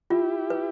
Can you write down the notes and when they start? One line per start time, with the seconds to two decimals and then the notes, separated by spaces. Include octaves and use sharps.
0.10 E4 F4 G4
0.50 B4